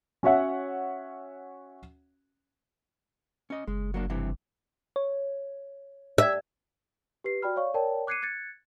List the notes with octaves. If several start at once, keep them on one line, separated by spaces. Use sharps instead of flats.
C#4 F#4 C#5 E5 F#5
C#4 D#5
F#1 G#3
F#3 A#3 D4
G2 C3 E3
C#5
D5 E5 G#6
G4 B4 C7
F#4 D5 G5 B5 F6
C#5 D5 F5 C#6
A#4 C#5 D5 G5 A5
D6 F#6 G#6 C7 C#7 D#7
F#6 G#6 A6 C#7